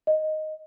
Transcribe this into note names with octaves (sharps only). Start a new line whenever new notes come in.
D#5